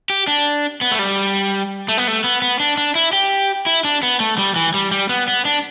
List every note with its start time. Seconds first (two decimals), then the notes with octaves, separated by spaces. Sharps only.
0.10 G4
0.28 D4
0.81 B3
0.92 A3
0.99 G3
1.88 A3
1.97 B3
2.08 A3
2.24 B3
2.42 B3
2.60 D4
2.77 D4
2.95 E4
3.13 G4
3.66 E4
3.84 D4
4.03 B3
4.20 A3
4.38 G3
4.56 E3
4.74 G3
4.91 G3
5.09 B3
5.28 B3
5.45 D4